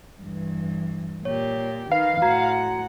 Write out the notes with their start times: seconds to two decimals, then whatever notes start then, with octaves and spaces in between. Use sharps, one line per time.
0.23 G2 E3
1.25 A#2 G4 C#5
1.91 D#3 D#4 B4 F5
2.22 A2 F#4 F#5 A#5 G#6